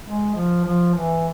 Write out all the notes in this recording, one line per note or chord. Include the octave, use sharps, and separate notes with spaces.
G#3
F3
F3
E3